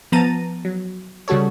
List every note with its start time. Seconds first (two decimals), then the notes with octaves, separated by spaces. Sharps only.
0.12 F3 B3 A5 A#5 A6 D#7
0.65 F#3
1.28 C#3 G3 F#4 A4 C#5